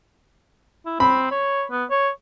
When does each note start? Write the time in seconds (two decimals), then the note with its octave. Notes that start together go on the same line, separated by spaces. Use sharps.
0.86 E4
1.00 C4 B5
1.31 C#5
1.72 B3
1.90 C#5